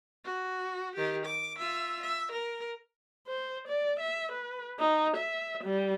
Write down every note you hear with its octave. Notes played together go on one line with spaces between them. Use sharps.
F#4
D#3 G4
D6
F4 E5
E5
A#4
C5
D5
E5
B4
D#4
E5
G3